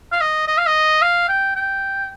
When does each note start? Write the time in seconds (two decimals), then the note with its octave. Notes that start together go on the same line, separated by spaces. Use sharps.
0.12 F5
0.21 D#5
0.47 D#5
0.58 F5
0.67 D#5
1.02 F5
1.29 G5
1.56 G5